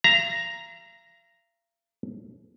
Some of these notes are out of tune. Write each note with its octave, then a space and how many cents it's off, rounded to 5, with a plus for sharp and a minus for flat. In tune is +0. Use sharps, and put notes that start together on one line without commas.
F5 -40 A#5 +0